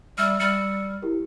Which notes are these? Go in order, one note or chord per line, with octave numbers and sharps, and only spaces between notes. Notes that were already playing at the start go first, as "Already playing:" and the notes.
G3 E5 E6 F6
G3 E6 F6 C#7
E4 G4 A#4